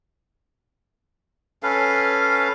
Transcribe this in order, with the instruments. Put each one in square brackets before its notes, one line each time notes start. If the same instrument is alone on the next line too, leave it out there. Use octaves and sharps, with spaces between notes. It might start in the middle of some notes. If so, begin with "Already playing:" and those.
[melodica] C#4 A4 B4 F5